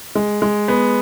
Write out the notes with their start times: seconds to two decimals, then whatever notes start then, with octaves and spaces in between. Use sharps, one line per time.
0.15 G#3
0.42 G#3
0.68 B3